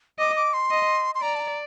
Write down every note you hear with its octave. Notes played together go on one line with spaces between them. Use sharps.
D#5 D6
D6
C6
D#5
C6
D5 A#5
A5
A#5